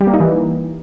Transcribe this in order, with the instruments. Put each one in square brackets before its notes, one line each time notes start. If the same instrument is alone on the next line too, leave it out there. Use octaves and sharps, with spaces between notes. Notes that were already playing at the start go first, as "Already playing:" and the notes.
[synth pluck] G3
A#3
D#4
E3